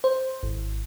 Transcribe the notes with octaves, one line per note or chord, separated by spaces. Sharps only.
C5
G#1